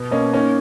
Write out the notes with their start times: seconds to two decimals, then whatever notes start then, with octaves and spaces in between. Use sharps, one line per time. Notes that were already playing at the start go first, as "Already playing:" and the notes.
Already playing: B2 B3
0.11 A#3 C#4 D#5
0.33 A#3 C#4 D#4